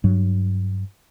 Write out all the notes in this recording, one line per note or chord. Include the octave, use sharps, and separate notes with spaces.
G2 F#3